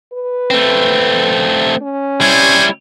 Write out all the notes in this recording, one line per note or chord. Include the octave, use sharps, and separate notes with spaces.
B4
A3 C4
C#4
G3 E4 C5 C#5 G#5